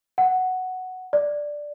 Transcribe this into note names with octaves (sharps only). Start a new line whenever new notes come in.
F#5
D5